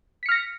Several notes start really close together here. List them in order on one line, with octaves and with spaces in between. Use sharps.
B6 C#7 F6 A#6